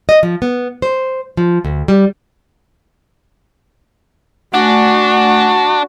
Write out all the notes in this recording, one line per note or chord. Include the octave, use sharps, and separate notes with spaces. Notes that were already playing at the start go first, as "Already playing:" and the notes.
D#5
F3
B3
C5
F3
D2
G3
A3 D4 F#4 F#5 G#5